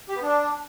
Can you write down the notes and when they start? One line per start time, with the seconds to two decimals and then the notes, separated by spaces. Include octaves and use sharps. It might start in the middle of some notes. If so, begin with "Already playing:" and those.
0.09 G4
0.15 B3
0.22 D4